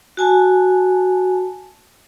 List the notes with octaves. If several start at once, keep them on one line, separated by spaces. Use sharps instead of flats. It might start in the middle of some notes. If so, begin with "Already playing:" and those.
F#4 G#5 A5